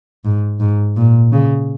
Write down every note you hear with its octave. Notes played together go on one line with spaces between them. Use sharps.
G#2
G#2
A#2
C#3